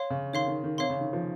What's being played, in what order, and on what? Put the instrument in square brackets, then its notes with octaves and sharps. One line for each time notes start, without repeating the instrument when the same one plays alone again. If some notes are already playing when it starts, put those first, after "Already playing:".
Already playing: [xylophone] C#5 F5 C6
[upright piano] C#3
[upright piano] D#3 [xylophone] C#5 F5 C6
[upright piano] D#3
D#3
[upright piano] C3 [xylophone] C#5 F5 C6
[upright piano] C#3
D#3
F3